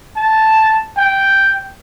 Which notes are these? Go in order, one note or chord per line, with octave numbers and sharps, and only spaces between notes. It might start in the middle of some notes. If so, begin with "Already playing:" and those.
A5
G5